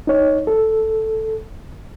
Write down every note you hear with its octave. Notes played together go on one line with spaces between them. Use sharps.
D#4 C#5
A4